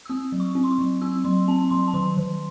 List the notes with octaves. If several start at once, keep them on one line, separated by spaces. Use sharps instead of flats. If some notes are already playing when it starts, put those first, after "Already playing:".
E6
C4 D#6
F#3
C#6
C4
C6
C#6
F#3
C4 E6
F#3 C6
C4 A5
F#3 C6
A5
D#3 C6
D#3